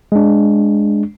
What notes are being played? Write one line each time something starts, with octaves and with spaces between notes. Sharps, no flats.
G#3 D4